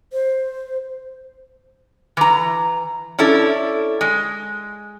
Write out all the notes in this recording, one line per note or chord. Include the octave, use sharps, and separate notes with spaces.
C5
E3 A#5
C#4 D4 E4 A4
G#3